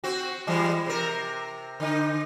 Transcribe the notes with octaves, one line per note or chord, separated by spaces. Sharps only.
C4 F#4
E3 G3 G#3
C3 A#4
D3 D#4